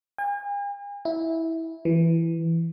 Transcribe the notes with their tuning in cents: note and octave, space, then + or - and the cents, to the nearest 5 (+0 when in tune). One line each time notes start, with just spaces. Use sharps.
G#5 -45
E4 -15
E3 +10